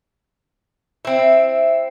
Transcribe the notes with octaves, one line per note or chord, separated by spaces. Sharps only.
C4 E4